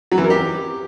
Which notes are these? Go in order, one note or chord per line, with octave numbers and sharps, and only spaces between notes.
F#3
E3
A#4
G4